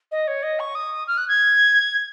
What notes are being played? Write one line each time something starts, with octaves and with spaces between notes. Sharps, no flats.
D#5
C#5
D#5
C#6
D#6
F6
F#6
G#6